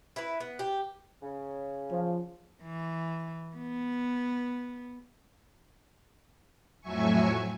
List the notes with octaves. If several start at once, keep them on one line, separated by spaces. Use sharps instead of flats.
E4 B4
B3
G4
C#3
F3
E3
B3
F2 A2 F#3 E5 G#5 C#6